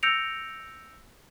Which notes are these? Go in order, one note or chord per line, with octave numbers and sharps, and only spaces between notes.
E6 G6 A#6 C#7 D7 F7